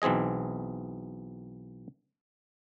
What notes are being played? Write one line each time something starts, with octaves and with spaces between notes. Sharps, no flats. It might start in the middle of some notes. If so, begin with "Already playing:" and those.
B1 E3 C4 G#4 D#5